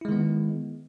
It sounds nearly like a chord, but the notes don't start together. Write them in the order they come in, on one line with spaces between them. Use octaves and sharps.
E4 G#3 D#3 B3